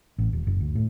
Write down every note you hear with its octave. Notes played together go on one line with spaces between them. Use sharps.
A1
D#1
F#1
D2
A2